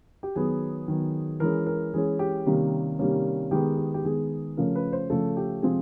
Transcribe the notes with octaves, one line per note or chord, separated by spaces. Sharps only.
G4
D#3 F#3 B3 G#4
D#3 F#3 B3
E3 G#3 C#4 A#4
A#4
E3 G#3 C#4 G#4
G4
C3 D#3 G3 A#3 C#4
C3 D#3 G3 A#3 C#4
D#3 G#3 B3 G4
G4
G4
D#3 G#3 B3 G#4
C#3 F3 A3 C#4 A#4
B4
C5
C#3 F3 A3 C#4 A4
G4
C3 F3 G#3 C4 G#4